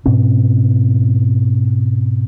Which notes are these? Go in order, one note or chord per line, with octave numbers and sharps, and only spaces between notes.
G#2 B2 C4 C#4